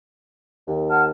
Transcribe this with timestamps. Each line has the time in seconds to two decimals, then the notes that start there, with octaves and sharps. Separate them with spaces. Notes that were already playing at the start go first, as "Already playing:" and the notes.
0.67 D#2
0.89 F#5 A5 F6